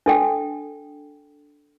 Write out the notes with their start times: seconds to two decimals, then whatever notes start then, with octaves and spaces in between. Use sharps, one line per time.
0.06 D4 A4 G5